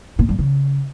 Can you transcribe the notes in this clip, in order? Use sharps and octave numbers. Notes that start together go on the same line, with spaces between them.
A#2
G2
C#3